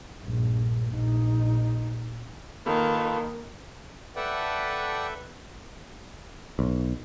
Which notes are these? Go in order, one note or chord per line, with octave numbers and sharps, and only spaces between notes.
A#1 G2
A#1 D#4
D#3 A#3 F4 A4 B4
A4 B4 D5 E5 F#5 G5
B1